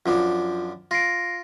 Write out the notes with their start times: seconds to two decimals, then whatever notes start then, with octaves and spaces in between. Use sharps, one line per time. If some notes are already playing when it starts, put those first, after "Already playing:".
0.06 F#2 F3 D4 F4
0.91 F4 A#6 C7 D7